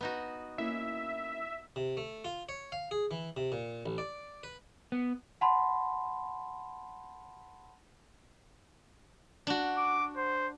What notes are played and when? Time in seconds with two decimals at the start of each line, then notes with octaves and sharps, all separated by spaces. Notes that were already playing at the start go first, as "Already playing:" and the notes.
0.01 B3 D#4 F#4
0.58 A#3 C#4 E4 E5
1.76 C3
1.97 A3
2.25 F4
2.49 C#5
2.72 F5
2.91 G#4
3.11 E3
3.37 C3
3.52 A#2
3.86 A1
3.98 D5
4.43 B4
4.92 B3
5.41 F#5 A5 B5 C6
9.47 D4 F#4
9.77 D6
10.17 C5